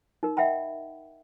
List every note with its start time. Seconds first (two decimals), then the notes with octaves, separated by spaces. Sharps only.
0.23 D#4 A#4
0.37 D#5 E5 F#5 G5 B5